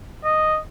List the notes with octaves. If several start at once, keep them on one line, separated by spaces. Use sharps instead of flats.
D#5